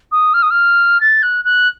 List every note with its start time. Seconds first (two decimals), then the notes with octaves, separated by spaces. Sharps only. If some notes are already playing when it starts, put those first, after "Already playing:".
0.12 D#6
0.34 F6
0.43 D#6
0.51 F6
1.01 A6
1.23 F#6
1.45 F#6